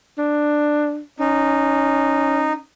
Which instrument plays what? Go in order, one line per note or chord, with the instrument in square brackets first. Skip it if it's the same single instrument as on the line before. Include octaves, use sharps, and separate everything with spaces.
[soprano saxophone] D4
[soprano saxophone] C#4 [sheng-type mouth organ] D#4